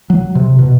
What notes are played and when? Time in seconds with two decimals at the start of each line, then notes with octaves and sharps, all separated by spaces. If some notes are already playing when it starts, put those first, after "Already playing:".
0.10 F#3
0.35 C3
0.59 B2